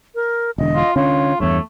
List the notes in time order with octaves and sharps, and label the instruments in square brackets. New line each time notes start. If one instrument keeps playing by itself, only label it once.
[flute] A#4
[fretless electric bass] E1 D3 [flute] D#5
[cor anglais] F4
[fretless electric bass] D3 C#4 [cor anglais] F4 [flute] C#5
[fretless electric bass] E2 G2 [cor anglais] A3 [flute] C#5